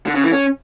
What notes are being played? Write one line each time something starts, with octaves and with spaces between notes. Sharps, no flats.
D3
C#3
E3
C#4